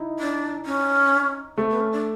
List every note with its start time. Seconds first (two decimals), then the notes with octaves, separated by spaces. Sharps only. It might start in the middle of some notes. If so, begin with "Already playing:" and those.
Already playing: D#4 E4
0.19 D4
0.66 C#4
1.57 A3 C4
1.69 B3
1.80 C#4
1.92 D4